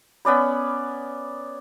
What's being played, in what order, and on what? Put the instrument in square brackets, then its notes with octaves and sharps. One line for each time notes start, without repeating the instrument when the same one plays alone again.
[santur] B3 C#4 D5 B5